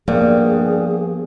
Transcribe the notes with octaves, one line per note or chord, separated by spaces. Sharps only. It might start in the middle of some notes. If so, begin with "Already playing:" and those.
G2 F3 A#3 B3 G#4